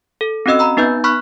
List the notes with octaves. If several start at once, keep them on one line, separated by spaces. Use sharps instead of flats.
A4
C4 C#4 F#4 D#5 E6
A#5 B5 E6
B3 D#4 B4 E5 G6
B5 C#6 F6 F#6 B6